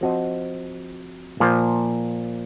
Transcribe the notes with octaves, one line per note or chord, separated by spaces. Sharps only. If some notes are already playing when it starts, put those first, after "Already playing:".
F3 C4 F#4 C5 D#5
A#2 F3 A#3 F4 C5